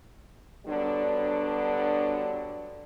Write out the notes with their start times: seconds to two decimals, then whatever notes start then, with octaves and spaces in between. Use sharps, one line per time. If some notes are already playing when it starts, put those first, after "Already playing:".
0.67 D3 F#3 G3 B3 D4